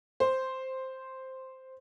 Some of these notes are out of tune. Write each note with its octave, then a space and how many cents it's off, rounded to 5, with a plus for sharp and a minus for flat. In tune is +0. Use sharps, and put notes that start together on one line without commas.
C5 +0